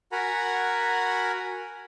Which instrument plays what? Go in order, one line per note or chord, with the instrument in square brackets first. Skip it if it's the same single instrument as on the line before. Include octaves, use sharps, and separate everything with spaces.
[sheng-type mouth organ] F#4 A#4 F#5 G#5 A#5 B5